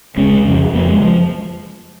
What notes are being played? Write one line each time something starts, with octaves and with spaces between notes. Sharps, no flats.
C#2 C#3 G#3 C#4
F2 C#3
F2 C#3 F3 A#3
G#3
F3